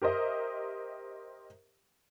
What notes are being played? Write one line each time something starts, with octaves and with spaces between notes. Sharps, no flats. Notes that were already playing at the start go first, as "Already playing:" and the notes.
G4 A#4 C5 D#5 E5